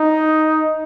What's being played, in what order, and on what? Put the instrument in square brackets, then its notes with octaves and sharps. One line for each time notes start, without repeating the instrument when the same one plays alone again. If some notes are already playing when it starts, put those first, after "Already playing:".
Already playing: [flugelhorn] D#4